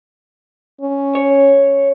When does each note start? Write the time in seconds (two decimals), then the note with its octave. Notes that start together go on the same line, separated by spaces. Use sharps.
0.81 C#4
1.15 C#5